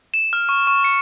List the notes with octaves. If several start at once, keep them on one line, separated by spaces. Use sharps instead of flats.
E7
F6
C#6
C#6
C#7